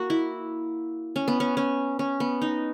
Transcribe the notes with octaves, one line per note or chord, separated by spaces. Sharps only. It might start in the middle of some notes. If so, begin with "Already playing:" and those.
Already playing: A#3 F#4
E4
C#4
B3
C#4
C#4
C#4
B3
D#4